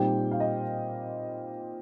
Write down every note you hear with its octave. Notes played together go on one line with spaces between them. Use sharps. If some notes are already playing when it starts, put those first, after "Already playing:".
Already playing: A#2 G3 C4 D#4 G5
F5
D#5